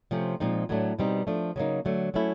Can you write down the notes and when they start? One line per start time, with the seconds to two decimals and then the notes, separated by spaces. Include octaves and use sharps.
0.11 C3 F3 A3 C#4
0.40 A#2 F3 G#3 C4 D#4
0.69 A2 F#3 A3 D4
0.99 B2 G3 C4 D#4
1.27 F3 A3 D4
1.56 C#3 F#3 A#3 D#4
1.85 D3 F#3 A3
2.14 F#3 A3 C#4 E4